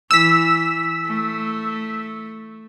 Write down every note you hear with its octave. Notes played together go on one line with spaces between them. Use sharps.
E3 E6 B6
A3